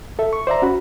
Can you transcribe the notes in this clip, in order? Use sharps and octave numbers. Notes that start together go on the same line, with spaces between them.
A4 E5
C#6
C5 D5 E5 A#5
C#4 F#4 B5